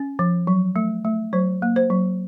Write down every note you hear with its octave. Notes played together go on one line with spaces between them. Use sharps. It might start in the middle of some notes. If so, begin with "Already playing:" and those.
Already playing: C#4
F3
F#3
A3
A3
F#3 C5
A#3
C5
F#3